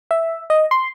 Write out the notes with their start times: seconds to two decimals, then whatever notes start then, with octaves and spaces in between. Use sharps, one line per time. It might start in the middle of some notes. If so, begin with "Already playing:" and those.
0.11 E5
0.50 D#5
0.71 C6